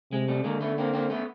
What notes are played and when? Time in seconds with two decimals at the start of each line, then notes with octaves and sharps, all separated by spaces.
0.11 C3 G#3
0.28 G3 A3
0.44 D3 G#3 A#3
0.61 A3 B3
0.78 A#3 C4
0.93 A#3 C4
1.10 A3 B3